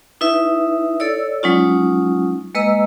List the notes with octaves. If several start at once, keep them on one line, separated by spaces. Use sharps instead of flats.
D#4 E4 B4 E5
A4 C#5 D5 E6
F#3 G#3 C#4 D#4 F4
G#3 A#3 B4 D#5 A#5 E6